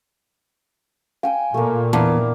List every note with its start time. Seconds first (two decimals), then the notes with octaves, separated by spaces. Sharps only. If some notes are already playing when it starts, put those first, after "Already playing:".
1.23 F5 G5 G#5
1.54 A#2 A3 A#3
1.93 E2 A#3 D4 E5 A5